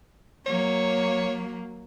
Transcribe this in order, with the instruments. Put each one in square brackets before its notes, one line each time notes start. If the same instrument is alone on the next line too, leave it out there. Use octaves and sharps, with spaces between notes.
[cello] F#3 A#3 [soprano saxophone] C#5